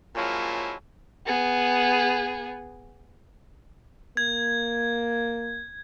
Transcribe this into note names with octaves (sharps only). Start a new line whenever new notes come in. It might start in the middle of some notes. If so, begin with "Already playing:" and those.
A#2 F3 F#3 G#3 C#4 E4
B3 G#4
A#3 G#6